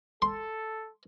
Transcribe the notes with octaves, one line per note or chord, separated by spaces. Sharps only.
A4 C6